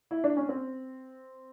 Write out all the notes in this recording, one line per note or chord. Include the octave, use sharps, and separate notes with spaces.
E4
D4
C#4
C4